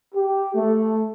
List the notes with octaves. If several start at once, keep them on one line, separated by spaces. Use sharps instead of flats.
G4
A3